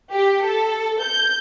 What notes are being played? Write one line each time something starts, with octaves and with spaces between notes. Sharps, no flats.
G4
A4
G6